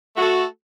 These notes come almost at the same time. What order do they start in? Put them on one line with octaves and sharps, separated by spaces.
A3 F#4 A4